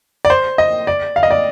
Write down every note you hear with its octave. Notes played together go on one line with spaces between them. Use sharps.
D5
C5
D#5
D5
F5
D#5
D5